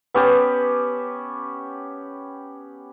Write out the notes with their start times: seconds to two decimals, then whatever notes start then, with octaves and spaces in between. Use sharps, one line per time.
0.14 B3 C#4 G4 A5